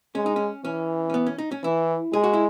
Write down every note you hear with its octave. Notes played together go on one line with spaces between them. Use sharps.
G#3 C#4
D#4
C#4
E3 C#4
C#4
B3
C#4
D#4
C#4
E3 E4
G#3 G#4
F#4
E4